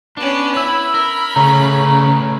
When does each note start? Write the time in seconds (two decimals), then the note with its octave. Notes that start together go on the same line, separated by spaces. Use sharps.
0.17 B3 C#4 D4
0.56 E4 B5 E6
0.94 A#4
1.36 C#3 A3 C#4 A#5